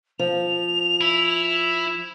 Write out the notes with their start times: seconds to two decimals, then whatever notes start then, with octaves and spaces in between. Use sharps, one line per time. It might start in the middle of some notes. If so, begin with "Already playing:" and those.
0.19 F3 F7
1.01 E4